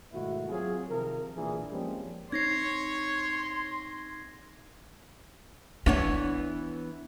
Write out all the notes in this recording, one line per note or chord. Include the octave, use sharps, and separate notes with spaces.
G#2 B2 D#3 A3 E4 F#4
F#3 C4 F4 G#4
C3 D#3 F3 A#4
B1 A#2 E3 D4 G#4
F3 G3 G#3 A#3 C4 C#4
C4 D#4 C#5 C6 G#6 A#6 C7
E3 B3 D4 C#5